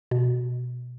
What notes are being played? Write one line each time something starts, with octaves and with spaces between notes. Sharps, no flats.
B2